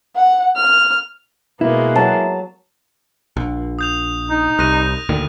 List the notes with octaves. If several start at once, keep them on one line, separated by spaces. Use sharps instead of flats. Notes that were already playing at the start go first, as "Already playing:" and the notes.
F#5
F6
B2 G#3 A#3 B3 E4
F#3 A5
A#1
D#6 G6 F7
D#4
C2 F#6 A#6 D#7
D2 A#2 D#3